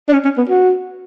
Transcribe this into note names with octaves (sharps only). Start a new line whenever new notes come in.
D4
C#4
C#4
B3
F#4